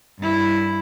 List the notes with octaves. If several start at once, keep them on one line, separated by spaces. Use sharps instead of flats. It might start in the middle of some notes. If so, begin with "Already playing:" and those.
G2 E4